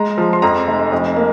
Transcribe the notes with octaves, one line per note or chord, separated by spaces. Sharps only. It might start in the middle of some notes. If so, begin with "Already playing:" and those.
Already playing: G#3 A#5
F3
C6
F2 A#5
F1
F2
A#3